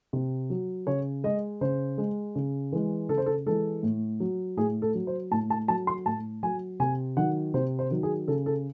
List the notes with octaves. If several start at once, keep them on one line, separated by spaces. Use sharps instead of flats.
C3
F#3
C#3 C#5
G#3 D#5
C#3 C5
G#3
C#3
E3 G#3
C#3 A4
C5
A4
E3 G#3 A4
A2
F#3
A2 G#4
A4
F#3
C5
A2 A5
A5
F#3 A5
C6
A2 A5
F#3 G#5
C3 G#5
D#3 F#3 F#5
C3 C5
C5
D#3 F#3
G#4
C#3 A4
A4